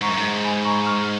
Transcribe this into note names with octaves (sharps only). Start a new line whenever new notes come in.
G#2 A#5 C#6
F#2
G#2
G#5 B5
A#5 C#6
C#6 F6
F6